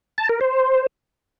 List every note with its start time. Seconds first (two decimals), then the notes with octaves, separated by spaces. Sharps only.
0.18 A5
0.29 A#4
0.41 C5